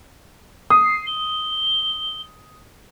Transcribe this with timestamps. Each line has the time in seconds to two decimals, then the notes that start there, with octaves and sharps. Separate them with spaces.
0.70 D#6 C7
1.06 G7